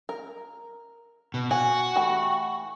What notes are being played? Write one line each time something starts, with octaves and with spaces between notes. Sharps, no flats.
A#4
B2
F#4 G#5
E3 A3 G4